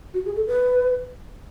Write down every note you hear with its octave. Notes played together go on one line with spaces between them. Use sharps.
F#4
G#4
A4
B4